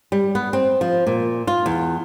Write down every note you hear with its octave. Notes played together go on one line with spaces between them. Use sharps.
G3
B3
C4
F3
A#2
F4
E2